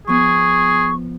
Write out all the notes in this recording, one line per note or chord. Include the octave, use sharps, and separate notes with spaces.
F3 B3 G#4 C#6